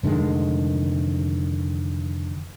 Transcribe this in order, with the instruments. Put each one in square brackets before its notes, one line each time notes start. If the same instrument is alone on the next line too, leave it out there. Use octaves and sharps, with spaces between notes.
[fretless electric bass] F1 D3 D#3 G#3